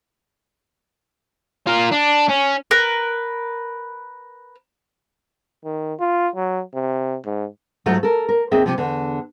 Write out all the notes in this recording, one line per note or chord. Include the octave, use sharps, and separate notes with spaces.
F4 A#4
D4
C#4
A#4 B4
D#3
F4
F#3
C3
G#2
G#2 F#3 A3 F4 F#4
A4 A#4
A#4
D#2 C4 G#4 D#5 E5
C3 F3
E2 D3